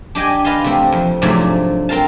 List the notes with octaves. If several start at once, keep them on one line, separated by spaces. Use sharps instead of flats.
D4 G4 D#5 G5 G#5
B4 D#5 F5 A5 C6
C3 A3 C4
F2
G#2 C3 F3 F#3 A3 D4
C4 A#4 F5 A5